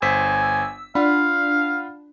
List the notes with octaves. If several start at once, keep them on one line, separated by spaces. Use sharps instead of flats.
G1 C5 G#5 E6 B6
D4 F4 F5 F#5 B5